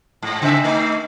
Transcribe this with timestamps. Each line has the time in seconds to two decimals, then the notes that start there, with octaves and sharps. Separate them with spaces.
0.22 G#2
0.42 C#3 C4 E5
0.64 A3 D#4